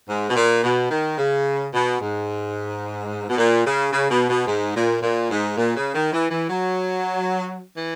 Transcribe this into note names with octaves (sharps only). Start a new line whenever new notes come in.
G#2
B2
A#2
B2
D#3
C#3
B2
G#2
B2
A#2
C#3
C#3
B2
B2
G#2
A#2
A#2
G#2
A#2
C#3
D#3
E3
E3
F#3
E3